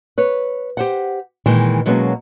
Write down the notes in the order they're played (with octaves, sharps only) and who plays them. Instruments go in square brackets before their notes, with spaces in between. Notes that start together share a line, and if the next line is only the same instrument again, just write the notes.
[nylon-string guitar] B4 C#5
G4 C5 F#5
A#2 D#3 E3 G#3
B2 F#3 G#3 A#3 B3 C#4